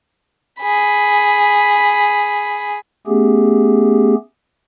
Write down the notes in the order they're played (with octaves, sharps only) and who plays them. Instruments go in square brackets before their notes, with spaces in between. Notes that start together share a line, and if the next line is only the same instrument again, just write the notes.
[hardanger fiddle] G#4 B5
[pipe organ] A3 B3 C#4 G4 G#4